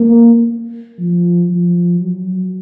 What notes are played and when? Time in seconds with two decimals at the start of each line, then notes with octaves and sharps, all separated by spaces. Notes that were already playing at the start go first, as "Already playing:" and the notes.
Already playing: A#3
0.99 F3
1.50 F3
2.00 F#3